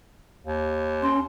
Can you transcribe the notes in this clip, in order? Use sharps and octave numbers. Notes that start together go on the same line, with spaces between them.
D#2
C#4 C6